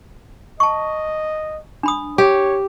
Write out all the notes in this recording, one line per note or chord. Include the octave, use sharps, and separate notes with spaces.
D#5 A5 C#6
D4 B5 D#6
G4 C#5